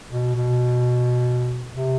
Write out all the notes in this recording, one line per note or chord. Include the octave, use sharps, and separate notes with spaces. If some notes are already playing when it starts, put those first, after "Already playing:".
B2
B2
C3